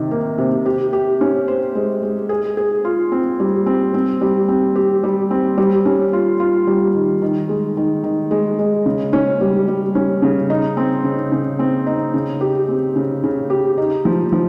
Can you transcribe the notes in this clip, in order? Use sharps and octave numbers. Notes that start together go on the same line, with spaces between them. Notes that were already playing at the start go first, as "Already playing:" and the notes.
Already playing: C3 D#3
A#3
C3
G4
G4
C#4
C5
G#3
G#3
G#4
G#4
F4
C4
G3
C4
C4
G3
C4
G4
G3
C4
G3
C#4
F4
F4
G3
D#3
D#3
G#3
D#3
D#3
G#3
G#3
C#3
C#4
G3
G3
C#4
C#3
D#4
C4
C#3
C#3
C4
D#4
C#3
G4
C4
C#3
C#3
G4
D#4
F3
F3